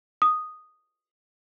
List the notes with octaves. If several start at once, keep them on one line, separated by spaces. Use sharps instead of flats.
D#6